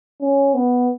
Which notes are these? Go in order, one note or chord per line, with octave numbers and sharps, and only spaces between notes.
C#4
B3